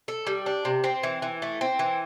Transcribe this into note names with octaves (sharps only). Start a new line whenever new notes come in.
A4
G3
D4
C3
C4
E3
E3
A3
C4
E3